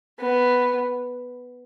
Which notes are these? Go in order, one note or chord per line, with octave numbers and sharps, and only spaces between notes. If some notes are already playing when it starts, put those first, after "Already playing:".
B3